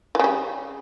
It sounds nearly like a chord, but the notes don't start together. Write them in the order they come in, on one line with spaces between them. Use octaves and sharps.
E3 C#3 G3